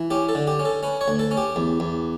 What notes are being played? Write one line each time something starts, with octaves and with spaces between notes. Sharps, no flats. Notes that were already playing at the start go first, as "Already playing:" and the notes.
Already playing: E3
C#4 G4
A4
D3
G4
C#4
A4
C#4 B4
C#5
D2
A4
C#4
G4
E2
E2